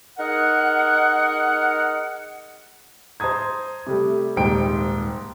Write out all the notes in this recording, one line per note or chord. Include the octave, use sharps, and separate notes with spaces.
D#4 G#4 A#4 F#5
C5 A5 A#5 D#6 G#6
C3 G3 A3
D#1 C2 G#2 C5 G5 D7